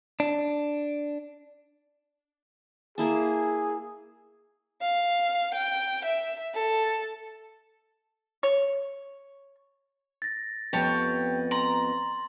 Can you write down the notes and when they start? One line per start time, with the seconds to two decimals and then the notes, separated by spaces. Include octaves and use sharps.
0.20 D4
2.98 A#3 E4 G#4 A5
4.81 F5
5.54 G5
6.05 E5
6.54 A4
8.43 C#5
10.22 A6 A#6
10.73 F2 B3 G4 C#5 A5
11.51 A#5 C6 F#7